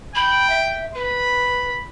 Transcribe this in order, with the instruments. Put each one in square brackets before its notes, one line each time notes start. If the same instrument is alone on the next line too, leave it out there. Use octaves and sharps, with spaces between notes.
[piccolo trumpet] G5 [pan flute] B5
[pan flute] E5
[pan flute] B4 [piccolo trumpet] B5